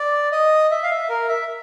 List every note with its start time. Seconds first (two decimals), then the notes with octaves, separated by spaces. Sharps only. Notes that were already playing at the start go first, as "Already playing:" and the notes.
Already playing: D5
0.32 D#5
0.71 E5
0.83 F5
0.90 E5
1.09 A#4
1.29 E5